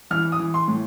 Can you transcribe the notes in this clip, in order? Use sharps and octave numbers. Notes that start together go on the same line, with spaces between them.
E3 F6
D#6
E3
C6
A2